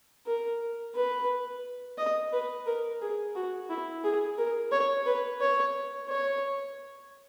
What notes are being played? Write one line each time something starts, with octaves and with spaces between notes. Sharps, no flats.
A#4
B4
D#5
B4
A#4
G#4
F#4
E4
G#4
A#4
C#5
B4
C#5
C#5